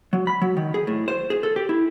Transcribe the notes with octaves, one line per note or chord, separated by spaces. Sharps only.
F#3
B5
F#3
D#3
G#4
A2
C5
G#4
A4
G4
E4